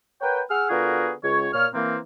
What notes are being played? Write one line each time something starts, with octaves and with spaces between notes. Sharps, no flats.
A#4 B4 C#5 F#5 G5
G#4 F#5 E6 F6
D3 B3 F4 F#4 G#4 A#4
C#2 C#5
A#2 C#5 F6
E3 A#3 C4